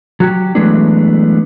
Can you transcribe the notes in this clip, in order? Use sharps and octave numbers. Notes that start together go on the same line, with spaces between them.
F#3 F#4 G4
E3 F#3 G#3 A3 B3 D4